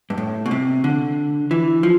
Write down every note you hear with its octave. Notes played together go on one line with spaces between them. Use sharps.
G2
A2
B2
C3
D3
E3
F3